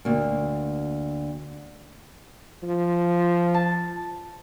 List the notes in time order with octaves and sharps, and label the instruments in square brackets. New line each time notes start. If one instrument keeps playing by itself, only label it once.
[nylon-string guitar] D2 A#3
[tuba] F3
[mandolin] A5